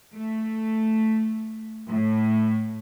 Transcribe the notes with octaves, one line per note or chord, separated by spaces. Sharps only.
A3
A2